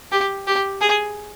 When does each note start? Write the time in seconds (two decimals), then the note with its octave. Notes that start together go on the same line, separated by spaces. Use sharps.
0.12 G4
0.47 G4
0.81 G#4